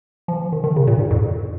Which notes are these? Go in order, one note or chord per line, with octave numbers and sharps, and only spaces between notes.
F3
D#3
D#3
C#3
A#2
G#2
F2